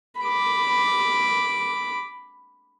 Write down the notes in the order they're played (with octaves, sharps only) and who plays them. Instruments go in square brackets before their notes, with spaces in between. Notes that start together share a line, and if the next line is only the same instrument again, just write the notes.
[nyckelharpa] B5 D6